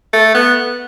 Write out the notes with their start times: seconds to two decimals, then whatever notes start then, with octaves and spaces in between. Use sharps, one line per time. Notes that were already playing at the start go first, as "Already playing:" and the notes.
0.13 A3
0.34 B3